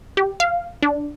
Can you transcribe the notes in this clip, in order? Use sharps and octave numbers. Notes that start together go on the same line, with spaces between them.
G4
F5
D4